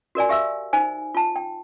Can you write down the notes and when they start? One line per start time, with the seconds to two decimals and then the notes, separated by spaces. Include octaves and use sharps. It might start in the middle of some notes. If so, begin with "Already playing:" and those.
0.15 F#4 A#4 D5 G#5
0.29 G4 E5 F5 E6
0.73 D#4 C5 G#5
1.15 F4 A5
1.36 G5